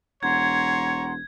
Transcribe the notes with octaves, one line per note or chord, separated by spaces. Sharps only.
E1 C#5 F#5 A#5 C6 G#6